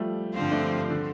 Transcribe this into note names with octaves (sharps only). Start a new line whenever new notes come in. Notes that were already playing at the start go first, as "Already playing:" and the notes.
Already playing: F3 G3 A3
G2 D3 F3 C4 F4
A3 D4
D3